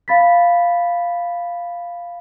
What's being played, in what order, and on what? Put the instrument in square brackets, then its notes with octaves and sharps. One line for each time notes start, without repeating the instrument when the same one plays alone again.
[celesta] F5 B5 A6 B6